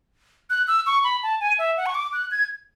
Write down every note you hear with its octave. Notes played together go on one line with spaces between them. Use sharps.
F#6
E6
C#6
B5
A5
G#5
E5
F#5
C#6
D6
F#6
G#6